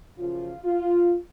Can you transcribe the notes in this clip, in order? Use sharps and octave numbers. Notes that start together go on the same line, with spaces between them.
F#2 C#3 F3 F4
F4